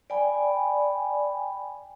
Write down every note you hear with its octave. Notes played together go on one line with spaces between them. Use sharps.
D5 G5 G#5 B5